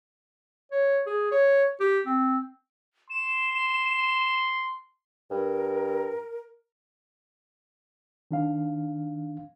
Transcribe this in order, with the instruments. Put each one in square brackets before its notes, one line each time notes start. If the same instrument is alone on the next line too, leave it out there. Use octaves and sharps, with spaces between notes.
[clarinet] C#5
G#4
C#5
G4
C4
[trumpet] C6 [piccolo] E7
[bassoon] G2 [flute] A#4
[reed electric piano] D#3 D4 F5